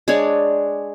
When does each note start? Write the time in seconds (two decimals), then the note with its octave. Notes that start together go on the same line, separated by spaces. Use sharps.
0.08 G#3 D4 G#4 C#5